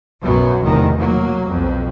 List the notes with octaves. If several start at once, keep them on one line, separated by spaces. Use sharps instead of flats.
B1 F#2 F#3 B3
F1 B1 E2 D#3
F#3 A#3
B1 F2